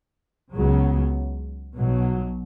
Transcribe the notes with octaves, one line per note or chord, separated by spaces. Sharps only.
C#2 C#3 F#3 B3
B1 B2 F#3